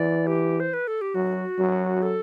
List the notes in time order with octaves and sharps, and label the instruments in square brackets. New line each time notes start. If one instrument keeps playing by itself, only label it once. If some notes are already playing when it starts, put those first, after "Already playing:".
Already playing: [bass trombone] E3 [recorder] D5
[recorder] G4
C5
B4
A4
G4
[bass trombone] F#3 [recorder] F#4
[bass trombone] F#3
[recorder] A4